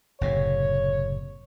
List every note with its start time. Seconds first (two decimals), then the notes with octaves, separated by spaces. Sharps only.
0.21 F#1 A2 C3 C#5